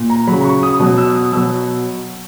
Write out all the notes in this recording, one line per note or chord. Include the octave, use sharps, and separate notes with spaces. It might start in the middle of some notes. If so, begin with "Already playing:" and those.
Already playing: A#2
A#5
C#3 F#3 B5
C#6
D#6
B2 F#3 D#6
E6
D#6
B2 F#3 E6